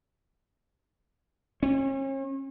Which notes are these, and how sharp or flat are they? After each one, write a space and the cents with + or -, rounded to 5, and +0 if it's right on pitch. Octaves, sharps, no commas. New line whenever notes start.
C#4 -40